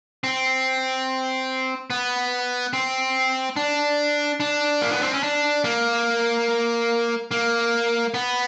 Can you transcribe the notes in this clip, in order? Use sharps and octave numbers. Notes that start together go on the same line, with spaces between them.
C4
B3
C4
D4
D4
A#3
B3
C4
C#4
D4
A#3
A#3
B3